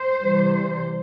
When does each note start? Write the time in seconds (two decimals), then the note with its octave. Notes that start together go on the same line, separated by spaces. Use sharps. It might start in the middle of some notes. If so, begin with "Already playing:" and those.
Already playing: C5
0.22 C3 E3 G3